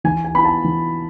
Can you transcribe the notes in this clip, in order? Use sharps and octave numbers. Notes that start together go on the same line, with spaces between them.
E3 G#5
G#5
B3 E4 B5
A5
E3